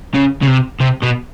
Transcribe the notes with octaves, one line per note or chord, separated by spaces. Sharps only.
C#3
C#3
C3
C3
B2